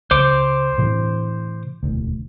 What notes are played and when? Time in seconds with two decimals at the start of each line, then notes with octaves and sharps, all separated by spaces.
0.11 C#2 C5 D6
0.78 A2 C3 E3
1.83 E1 D2